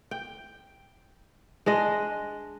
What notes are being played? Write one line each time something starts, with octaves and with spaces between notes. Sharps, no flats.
G5
G#3 D4 D#5